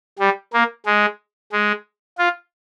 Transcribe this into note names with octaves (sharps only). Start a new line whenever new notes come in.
G3
A#3
G#3
G#3
F4